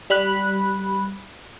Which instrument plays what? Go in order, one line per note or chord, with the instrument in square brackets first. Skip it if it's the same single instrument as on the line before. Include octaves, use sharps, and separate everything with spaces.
[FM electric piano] G3 B5 F#6